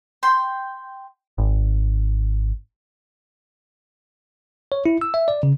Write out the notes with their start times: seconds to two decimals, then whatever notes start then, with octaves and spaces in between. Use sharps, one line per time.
0.23 G5 C6
1.38 G#1
4.72 C#5
4.86 E4
5.01 E6
5.14 E5
5.28 D5
5.43 C#3